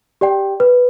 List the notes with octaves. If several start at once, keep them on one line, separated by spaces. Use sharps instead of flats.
G4 D5 G5
B4